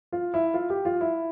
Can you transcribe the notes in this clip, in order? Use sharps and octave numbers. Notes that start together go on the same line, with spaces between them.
F4
E4
F4
G4
F4
E4